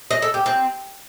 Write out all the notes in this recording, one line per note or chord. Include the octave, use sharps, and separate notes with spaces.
D#5
A4
G4
C4